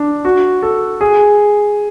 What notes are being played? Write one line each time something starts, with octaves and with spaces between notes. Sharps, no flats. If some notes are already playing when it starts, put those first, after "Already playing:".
Already playing: D4
F#4
A4
G#4